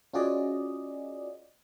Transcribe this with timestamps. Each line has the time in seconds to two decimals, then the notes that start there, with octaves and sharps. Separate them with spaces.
0.13 C#4 F4 F#4 G#4 D5 D#5